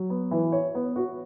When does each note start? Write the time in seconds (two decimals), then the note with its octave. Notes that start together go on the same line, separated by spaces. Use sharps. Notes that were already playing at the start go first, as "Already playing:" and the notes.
Already playing: F#3
0.10 B3
0.31 E3
0.52 C#5
0.75 B3
0.96 F#4